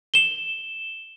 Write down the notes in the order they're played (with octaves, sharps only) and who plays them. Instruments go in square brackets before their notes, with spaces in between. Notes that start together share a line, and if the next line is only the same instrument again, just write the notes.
[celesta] E7 G7